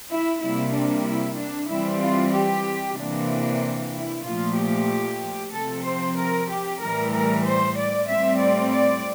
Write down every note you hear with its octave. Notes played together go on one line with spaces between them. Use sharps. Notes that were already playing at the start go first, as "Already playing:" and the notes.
E4
C3 G3 A#3 E4
D4
E4
D4
E3 G3 C4 E4
F4
G4
C3 E3 A#3 D4
E4
A#2 F3 A3 F4
G4
C3 F3 C4 A4
C5
A#4
G4
A2 E3 G3 A#4
A#4
C5
D5
A2 G3 C4 E5
D5
D5